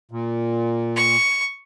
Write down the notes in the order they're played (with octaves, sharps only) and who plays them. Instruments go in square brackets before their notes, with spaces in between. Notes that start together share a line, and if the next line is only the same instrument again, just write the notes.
[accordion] A#2
[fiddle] C#6